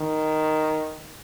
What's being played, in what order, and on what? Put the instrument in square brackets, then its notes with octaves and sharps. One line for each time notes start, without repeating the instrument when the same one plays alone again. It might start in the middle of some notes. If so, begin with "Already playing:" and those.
Already playing: [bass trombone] D#3